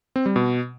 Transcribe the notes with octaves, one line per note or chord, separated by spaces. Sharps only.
C4
G3
B2